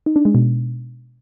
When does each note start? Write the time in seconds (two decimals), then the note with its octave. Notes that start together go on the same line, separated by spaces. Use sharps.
0.06 D#4
0.16 D4
0.25 G#3
0.35 B2